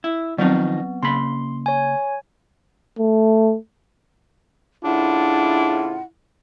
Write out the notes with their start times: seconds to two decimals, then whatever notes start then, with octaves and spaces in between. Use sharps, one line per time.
0.04 E4
0.38 D#3 F3 F#3 B3 C4 D#4
1.03 C#3 A#3 B5 C6
1.66 C#5 G#5
2.99 A3
4.84 A2 C#3 D4 E4 F4 F#5